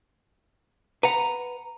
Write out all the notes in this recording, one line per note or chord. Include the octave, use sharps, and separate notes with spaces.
B4 F#5 A#5